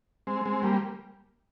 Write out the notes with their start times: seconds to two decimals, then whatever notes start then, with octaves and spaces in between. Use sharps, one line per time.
0.27 G#3 C4
0.45 G#3 C4
0.63 G3 A#3